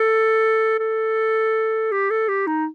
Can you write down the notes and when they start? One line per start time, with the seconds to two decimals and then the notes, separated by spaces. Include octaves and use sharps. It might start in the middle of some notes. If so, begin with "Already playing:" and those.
Already playing: A4
0.79 A4
1.92 G4
2.10 A4
2.28 G4
2.47 D#4